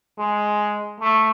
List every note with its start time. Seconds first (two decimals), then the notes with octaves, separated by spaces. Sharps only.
0.18 G#3
1.01 A3